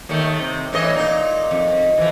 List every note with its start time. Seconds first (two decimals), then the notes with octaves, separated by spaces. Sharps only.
0.09 D#2 D#3 A3
0.40 C3
0.73 A2 E3 D#5
0.93 A#2 D#4
1.51 F2
1.98 E3 F3